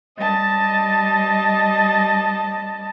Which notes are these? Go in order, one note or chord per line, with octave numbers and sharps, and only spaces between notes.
G3 D#5 A5